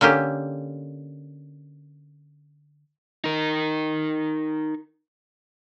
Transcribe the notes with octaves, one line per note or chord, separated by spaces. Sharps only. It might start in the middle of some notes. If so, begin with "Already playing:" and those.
D3 A#3 C#4 G4
D#4 A#4